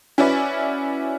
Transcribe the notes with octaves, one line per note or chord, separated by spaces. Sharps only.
C#4 E4 F#4 B4 D5